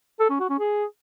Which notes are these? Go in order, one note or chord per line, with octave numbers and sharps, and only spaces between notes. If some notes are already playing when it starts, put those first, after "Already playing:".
A4
C#4
F#4
C#4
G#4